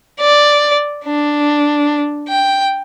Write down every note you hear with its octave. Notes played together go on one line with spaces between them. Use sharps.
D5
D4
G5